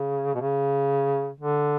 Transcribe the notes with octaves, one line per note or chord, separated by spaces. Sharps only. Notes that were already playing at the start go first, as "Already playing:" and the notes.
Already playing: C#3
B2
C#3
D3